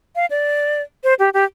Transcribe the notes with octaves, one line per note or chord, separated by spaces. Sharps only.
F5
D5
C5
G4
G4